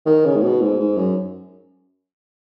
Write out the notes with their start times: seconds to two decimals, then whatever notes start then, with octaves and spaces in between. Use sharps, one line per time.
0.06 D#3
0.25 C#3
0.36 G#2
0.43 B2
0.61 G#2
0.79 G#2
0.97 F#2